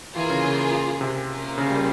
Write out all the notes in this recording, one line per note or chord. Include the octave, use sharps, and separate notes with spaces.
E3 A#3 F4 G#4
C#3
C#3
C3
A#3 C#4 F4 A#4
C#3
G3